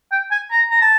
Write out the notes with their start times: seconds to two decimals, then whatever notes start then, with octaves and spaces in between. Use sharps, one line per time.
0.12 G5
0.31 G#5
0.51 A#5
0.71 A#5
0.82 A5